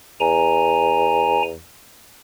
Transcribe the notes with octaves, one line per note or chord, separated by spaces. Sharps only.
E2 G#5 A#5